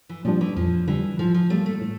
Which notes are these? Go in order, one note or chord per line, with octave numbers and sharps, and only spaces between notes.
E3
A#2 F3 G3 D4
E3
F2 F3
D3 E3 G3
A2 F3
F3
G3 A3 A#3
A3
A2